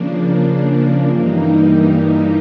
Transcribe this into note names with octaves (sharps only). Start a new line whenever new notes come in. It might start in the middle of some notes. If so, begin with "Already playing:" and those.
Already playing: C#3 F3 A#3 D4
G2 E3 G3 A#3 D#4